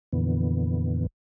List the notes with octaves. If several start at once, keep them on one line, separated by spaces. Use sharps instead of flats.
F2 A#2 D3 E3 B3